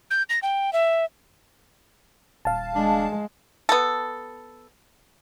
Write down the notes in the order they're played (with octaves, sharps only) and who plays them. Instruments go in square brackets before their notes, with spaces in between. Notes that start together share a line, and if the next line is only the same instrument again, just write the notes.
[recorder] G6
A#6
G5
E5
[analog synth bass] D#1 [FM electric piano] F5 A5
[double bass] G#3 [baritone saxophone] D4
[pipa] B3 A4